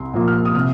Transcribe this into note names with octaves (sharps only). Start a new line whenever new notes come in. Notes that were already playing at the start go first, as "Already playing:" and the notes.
Already playing: C2 C6
A#2 F3 A#3
F6
D#6
C3 F6